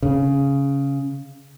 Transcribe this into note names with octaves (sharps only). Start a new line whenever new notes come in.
C#3